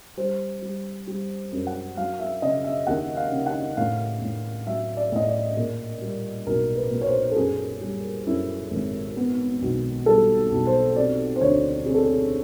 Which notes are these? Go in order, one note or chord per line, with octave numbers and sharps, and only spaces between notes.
G3 C5
G3
G3
F#2
F#5
F#3 F5
E5
C#3 D#5
E5
D#2 F#5
F5
C#3
F#5
A2 F5
A2
F#3 E5
D5
A2 D#5
D5
A#2
G3
B1 A#4
B4
A#2
C#5
C5
A4
F#2 G#4
G3
F#2 E4
G#1
B3
B1
G3 A4
B1
C5
C3 D5
C5
D2 C#5
C3 G#4
A4
G#4